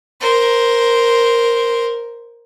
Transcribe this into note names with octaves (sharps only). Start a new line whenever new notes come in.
A#4 C5